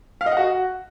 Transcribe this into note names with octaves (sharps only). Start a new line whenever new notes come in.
F5
D#5
F#5
F#4